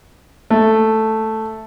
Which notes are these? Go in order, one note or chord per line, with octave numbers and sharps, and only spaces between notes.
A3